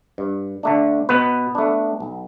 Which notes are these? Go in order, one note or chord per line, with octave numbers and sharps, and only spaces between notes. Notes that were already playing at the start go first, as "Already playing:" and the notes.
G2
D3 A3 D4
B2 B3 B4
A3 D4
B1